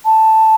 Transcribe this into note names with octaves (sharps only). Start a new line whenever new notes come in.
A5